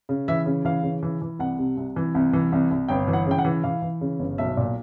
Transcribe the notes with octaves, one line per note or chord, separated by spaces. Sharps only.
C#3
E3 E5
C#3
E3 F5
C#3
E3
E3
C2 F#5
C3
C2
E3
C2
E3
C2
C2
G1 G5
E3
F#5
C#3 G5
F#5
E3
E3 F5
E3
C#3
G1
B1 E5
A#2